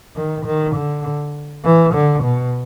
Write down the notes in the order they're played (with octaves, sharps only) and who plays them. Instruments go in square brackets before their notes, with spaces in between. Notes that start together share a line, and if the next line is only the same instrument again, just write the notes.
[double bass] D#3
D#3
D3
E3
D3
B2